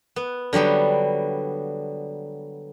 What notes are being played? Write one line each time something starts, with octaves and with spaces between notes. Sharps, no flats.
B3
D3 F#3 G3 B3 G5